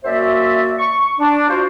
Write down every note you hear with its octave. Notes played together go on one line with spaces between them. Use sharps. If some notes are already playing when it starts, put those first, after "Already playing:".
F#2 A#3 F#4 C5 D5 E5
C#6
D4
F4 F#4 C5